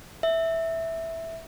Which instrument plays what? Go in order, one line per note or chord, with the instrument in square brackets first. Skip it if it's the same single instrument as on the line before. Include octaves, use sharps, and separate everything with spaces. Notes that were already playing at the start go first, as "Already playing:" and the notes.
[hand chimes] E5